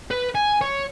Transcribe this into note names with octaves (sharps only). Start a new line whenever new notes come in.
B4
G#5
C#5